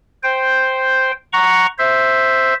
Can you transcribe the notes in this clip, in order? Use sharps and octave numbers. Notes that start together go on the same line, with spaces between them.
C5 G5
F#5 A#5 C#6
C5 E5